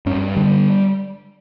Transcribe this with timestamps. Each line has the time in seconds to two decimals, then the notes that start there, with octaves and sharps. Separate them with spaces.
0.06 G2 C#4
0.36 D3 G3